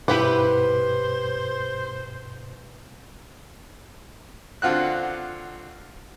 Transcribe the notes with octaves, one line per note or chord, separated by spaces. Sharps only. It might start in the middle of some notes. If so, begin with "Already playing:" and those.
G2 B2 E4 G4 B4 C5 F#5 D6
D3 C4 F4 F#4 F#6